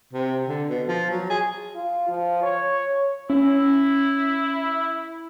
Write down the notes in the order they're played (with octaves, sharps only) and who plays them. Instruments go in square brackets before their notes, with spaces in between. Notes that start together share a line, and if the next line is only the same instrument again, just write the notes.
[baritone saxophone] C3
D3
B2
F3
F#3
G#4
[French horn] F4
F3
C#5
[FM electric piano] C#4 [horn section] E4